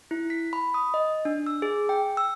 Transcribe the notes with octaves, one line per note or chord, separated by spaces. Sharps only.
E4
B6
B5
D#6
D#5
D4
E6
G#4
G5
E6